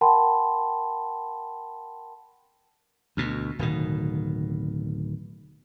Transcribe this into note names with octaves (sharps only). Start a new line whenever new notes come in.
A#4 F#5 G5 A5 B5 C6
D2 B2
D1 B2 D#3